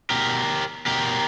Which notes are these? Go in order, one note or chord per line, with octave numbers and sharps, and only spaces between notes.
B2 G4 A#4
B2 G4 A#4